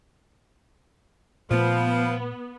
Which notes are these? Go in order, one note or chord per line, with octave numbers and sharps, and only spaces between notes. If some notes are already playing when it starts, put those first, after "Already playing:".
A#2 F3 A3 B3